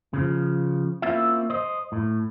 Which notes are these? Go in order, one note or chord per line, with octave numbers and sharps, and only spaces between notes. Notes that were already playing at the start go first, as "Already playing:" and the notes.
C#3 F3
A#3 C4 C#4 E4 F4 E5
C5 D#5
A2